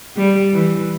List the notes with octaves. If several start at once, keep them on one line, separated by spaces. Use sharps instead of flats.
G3
E3